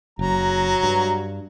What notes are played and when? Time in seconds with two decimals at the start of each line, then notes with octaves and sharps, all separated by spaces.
0.19 F#1 F#3 A#5
0.83 G2